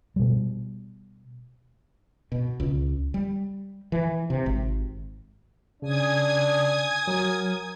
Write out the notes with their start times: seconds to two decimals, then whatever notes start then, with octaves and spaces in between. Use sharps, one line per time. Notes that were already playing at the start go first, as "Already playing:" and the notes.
0.16 B2 G3
2.32 B2
2.60 C#2
3.14 G3
3.92 E3
4.30 C3
4.46 G#1
5.82 C#3 D4 G#5 D#6 G#6
7.07 F#3 A#4